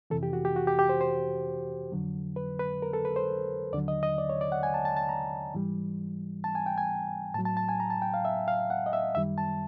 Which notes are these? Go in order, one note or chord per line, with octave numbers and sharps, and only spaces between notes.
F2 C3 E3 A4
G4
F#4
G4
F#4
G4
G4
C5
C5
F2 D3 F#3
B4
B4
A#4
A4
B4
C5
D#2 D3 F#3 D5
D#5
D#5
D5
C#5
D5
F#5
G#5
A5
A5
A5
A#5
G#2 E3 G3
A5
G#5
G5
G#5
A2 F#3 A5
A5
A5
G#5
A#5
A5
G5
F5
E5
F5
F#5
D#5
E5
F#2 D#3 G3 E5
A5